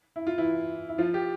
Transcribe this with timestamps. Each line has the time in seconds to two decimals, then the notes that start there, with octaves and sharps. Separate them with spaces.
0.16 E4
0.27 F4
0.38 E3 E4
0.89 E4
0.98 F3 F4
1.14 G4